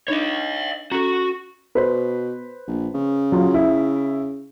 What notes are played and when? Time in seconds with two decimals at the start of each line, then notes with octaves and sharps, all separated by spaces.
0.08 D4 D#4 C#5 D#5
0.92 C#4 F#4 A4
1.75 B2 B4 C5
2.67 A#1
2.94 C#3
3.32 F#3 F4
3.54 E4